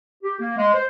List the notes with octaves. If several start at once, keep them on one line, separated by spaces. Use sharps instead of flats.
G4
A#3
G#3
C5